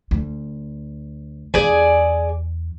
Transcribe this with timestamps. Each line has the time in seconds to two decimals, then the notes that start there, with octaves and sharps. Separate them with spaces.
0.11 D2
1.54 E2 D4 G#4 D5 G#5